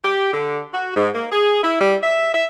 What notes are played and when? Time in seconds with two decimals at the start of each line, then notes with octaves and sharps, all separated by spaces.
0.04 G4
0.33 D3
0.72 F#4
0.96 G#2
1.15 A#3
1.32 G#4
1.63 E4
1.81 G3
2.03 E5
2.34 E5